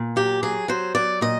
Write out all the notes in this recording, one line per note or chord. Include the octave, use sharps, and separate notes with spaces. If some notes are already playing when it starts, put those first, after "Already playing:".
Already playing: A#2
F#3 G4
F#3 G#4
F#3 C5
F#3 D5
A#2 D#5